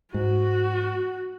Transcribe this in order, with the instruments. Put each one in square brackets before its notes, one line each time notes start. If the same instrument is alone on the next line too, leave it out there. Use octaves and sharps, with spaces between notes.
[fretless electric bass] G#2 [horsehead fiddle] F#4